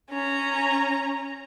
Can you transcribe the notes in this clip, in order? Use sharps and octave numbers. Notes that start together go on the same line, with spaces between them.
C#4 A#5